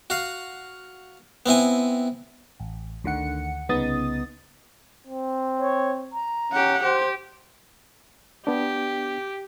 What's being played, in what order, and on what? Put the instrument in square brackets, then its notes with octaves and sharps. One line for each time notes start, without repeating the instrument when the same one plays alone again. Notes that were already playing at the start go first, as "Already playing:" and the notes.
[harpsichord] F#4 F5
B3 C4 E4 G#5
[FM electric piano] A1
D2 D3 D#3 F#5 C#7
C2 C#3 B3 D#4 D#6 A6
[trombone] C4
[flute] C#5
A#5
[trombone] C#4 [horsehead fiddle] G4 F#5
[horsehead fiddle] G4 [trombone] C5
[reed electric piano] B3 D4 [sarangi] G4